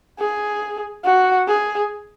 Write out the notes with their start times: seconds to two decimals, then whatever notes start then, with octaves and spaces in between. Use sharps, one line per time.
0.19 G#4
1.04 F#4
1.48 G#4